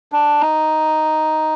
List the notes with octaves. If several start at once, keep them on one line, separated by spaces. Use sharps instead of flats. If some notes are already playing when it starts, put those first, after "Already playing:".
D4
D#4